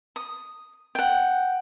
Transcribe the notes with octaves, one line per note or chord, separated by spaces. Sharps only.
D#6
F#5 G5